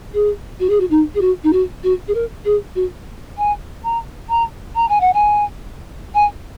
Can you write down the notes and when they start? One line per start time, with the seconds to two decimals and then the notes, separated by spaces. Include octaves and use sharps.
0.14 G#4
0.60 F#4
0.69 G#4
0.80 F#4
0.90 D#4
1.14 G#4
1.21 F#4
1.43 D#4
1.52 F#4
1.83 F#4
2.07 G#4
2.14 A#4
2.45 G#4
2.75 F#4
3.37 G#5
3.83 A#5
4.29 A#5
4.75 A#5
4.88 G#5
5.00 F#5
5.13 G#5
6.14 G#5